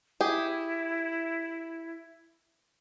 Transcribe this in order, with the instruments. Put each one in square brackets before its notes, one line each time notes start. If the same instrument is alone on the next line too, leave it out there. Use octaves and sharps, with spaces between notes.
[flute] E4 [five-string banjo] G4 G#4